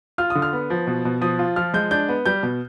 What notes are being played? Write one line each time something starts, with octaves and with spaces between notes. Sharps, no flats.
F4 F6
D#6
D3
F6
B3
F3
B2
B2
F3 D#6
F4
F3 F6
G#3 G6
D4 G6
B3
G3 G6
B2